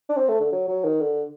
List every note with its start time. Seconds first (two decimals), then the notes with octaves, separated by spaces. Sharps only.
0.09 D4
0.17 C4
0.29 A3
0.40 D3
0.52 F#3
0.68 F#3
0.85 D#3
1.00 D3